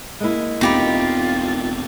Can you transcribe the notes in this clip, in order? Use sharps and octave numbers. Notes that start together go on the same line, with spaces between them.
G#3 A#3 E4
E1 B3 C4 D#4 F4 G4 B5